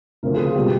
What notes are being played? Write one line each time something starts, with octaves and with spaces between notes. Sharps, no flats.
D2 C#3 F3 A3 C4 A#4
G#4
F4
B2 G3 G4